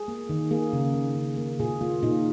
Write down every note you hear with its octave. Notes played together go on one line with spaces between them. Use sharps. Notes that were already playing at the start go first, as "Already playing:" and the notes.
Already playing: G#4
A#3
D#3
A#3 G#4
C#3
A#3
C#3
A#3
A#2 G#4
A#3 F4
A#2 D#4